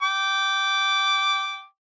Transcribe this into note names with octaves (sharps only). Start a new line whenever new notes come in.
G5 D6